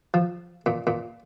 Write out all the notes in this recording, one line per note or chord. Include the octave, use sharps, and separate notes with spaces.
F3
A#2
A#2